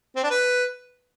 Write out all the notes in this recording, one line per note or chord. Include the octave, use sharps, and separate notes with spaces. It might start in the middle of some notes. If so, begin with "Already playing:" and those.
C4
D4
B4